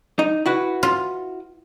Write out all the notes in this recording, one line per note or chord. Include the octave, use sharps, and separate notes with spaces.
D#4
E4 F#4 B4
F4